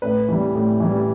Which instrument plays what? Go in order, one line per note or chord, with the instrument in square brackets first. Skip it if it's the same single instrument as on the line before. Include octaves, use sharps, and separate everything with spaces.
[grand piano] A2 B4
E3 G3
A2
E3 G3